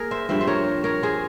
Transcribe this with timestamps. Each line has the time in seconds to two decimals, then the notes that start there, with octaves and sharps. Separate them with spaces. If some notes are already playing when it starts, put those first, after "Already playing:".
Already playing: A#3 G#4 A#4
0.11 C5 E5
0.29 G2 F3 C4 C5 E5
0.41 C5
0.47 A#4 C#5
0.84 A#4 C#5
1.02 G#4 C5